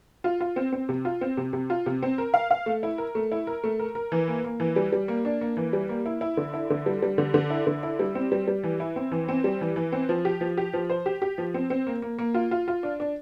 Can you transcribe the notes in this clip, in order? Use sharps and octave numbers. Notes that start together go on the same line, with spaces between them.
F4
F4
C4
C4
C3
F4
C4
C3
C3
F4
C3
C4
A#4
F5
F5
A3
E4
A#4
A3
E4
A#4
A3
A#4
A#4
E3
A#3
A#3
E3
G3
G3
A#3
D4
A#3
E3
G3
A#3
E4
E4
D3
E4
D3
G3
G3
D3
D3
E4
D3
E4
G3
C4
G3
G3
E3
E4
C4
E3
C4
G3
E3
E3
C4
F3
G4
F3
G4
F3
C5
G4
G4
F3
C4
C4
A#3
A#3
A#3
F4
F4
F4
D4
D4